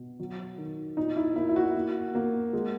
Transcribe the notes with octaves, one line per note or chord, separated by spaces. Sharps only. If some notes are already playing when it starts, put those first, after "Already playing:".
Already playing: B2
F#3
D#3
A#2 D#4
E4
A#3 E4
E4
F#4
A#3
A#3
G#3